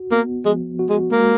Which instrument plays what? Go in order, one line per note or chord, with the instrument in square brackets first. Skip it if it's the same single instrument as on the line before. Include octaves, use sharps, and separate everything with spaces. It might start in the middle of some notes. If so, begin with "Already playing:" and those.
Already playing: [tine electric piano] F#4
[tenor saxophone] A#3 [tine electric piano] B3
[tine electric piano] F3 [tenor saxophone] G#3
[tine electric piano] F#4
[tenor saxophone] G#3
[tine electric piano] G#3 [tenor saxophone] A#3